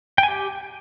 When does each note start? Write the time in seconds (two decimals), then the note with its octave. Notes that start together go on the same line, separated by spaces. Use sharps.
0.18 G5
0.23 G#5
0.28 G4